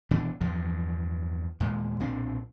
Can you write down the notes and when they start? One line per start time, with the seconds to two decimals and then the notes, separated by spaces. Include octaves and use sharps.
0.11 D#1 B2 E3 D4
0.41 E2 G2 F3
1.60 D#2 A#2 G#3
2.00 B1 A#2 C4 D4